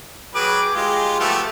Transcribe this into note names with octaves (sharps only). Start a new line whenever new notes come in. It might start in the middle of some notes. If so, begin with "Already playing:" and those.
F#3 G#4 B4 G5 D6
G#3 F4 G4
F3 A3 B3 F#4 G4 A4